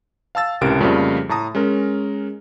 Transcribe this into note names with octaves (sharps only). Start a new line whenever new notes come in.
F5 A5 E6 A6
C#2 A2 C3 A#4 D7
F2 C#3 F3 G3 A3 A#3
A2 A5 A#5 D#6
G#3 C#4 A#4